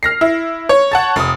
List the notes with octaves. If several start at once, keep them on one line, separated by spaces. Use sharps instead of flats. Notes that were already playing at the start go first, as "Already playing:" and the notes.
F6 A#6 C7
E4
C#5
F#5 A5 A6
F1 D#6